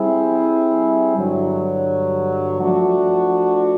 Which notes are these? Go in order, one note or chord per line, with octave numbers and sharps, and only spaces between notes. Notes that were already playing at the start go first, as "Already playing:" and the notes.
Already playing: G3 C4 E4 G#4
G2 D3 F#3
F3 A3 D4 F#4